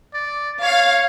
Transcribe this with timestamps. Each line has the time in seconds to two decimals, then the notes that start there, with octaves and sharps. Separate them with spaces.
0.14 D5
0.62 C#5 F5